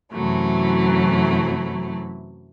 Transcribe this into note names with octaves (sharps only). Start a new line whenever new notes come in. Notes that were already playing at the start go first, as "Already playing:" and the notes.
F#2 C3 E3 F#3 A3 E4